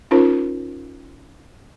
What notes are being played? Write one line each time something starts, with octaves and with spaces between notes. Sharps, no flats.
C#4 D#4 F4 A#4 C5